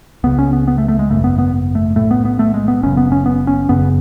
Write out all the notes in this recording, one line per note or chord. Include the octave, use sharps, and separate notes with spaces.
C#2 C#3 B3
C#4
B3
B3
A3
A3
G#3
G#1 F#2 C#3 A3
B3
B3
A3
B1 A2 A3
B3
B3
A3
G#3
B3
F#1 F#2 C#3 C#4
B3
C#4
B3
C#4
F#1 F#2 C#3 B3